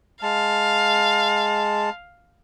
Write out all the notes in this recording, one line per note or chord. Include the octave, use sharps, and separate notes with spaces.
G#3 F5 A5